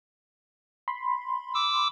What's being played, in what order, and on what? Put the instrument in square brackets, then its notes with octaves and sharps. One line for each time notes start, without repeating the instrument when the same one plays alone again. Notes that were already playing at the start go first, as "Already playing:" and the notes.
[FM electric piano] B5 C6
[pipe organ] D6 E6